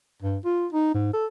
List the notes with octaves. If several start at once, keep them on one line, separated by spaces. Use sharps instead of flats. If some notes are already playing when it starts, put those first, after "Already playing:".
G2
F4
D#4
G#2
A4